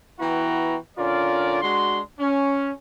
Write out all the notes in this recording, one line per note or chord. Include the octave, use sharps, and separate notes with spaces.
E3 B3 E4 F#4 G5 A#5
D3 C#4 F4 A#4 D5
G#3 D4 F#4 C6
C#4